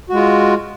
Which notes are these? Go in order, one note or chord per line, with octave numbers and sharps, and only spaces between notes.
G#3 F4 F#4